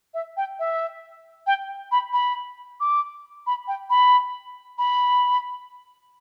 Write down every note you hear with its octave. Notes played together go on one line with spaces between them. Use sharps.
E5
G5
E5
G5
B5
B5
D6
B5
G5
B5
B5